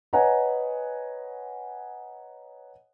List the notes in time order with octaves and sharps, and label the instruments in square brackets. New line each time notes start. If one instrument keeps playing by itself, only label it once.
[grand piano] B4 C#5 D#5 F#5 G#5 A#5